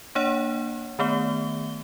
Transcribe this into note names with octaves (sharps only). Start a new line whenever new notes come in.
A#3 D4 C#5 F#5
D#3 A3 B3 G7